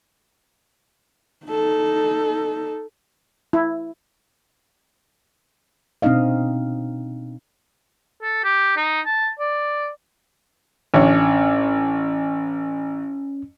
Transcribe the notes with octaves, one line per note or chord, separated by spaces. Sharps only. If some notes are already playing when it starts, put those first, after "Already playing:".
D#4 A4
E4
B2 C4 D4 D#4 D#5 F5
A4
G4
D#4
A5
D5
A1 C#4 D4 C#5